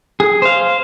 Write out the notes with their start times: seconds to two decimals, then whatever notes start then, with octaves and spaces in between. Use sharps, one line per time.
0.20 G#4
0.42 C5 F5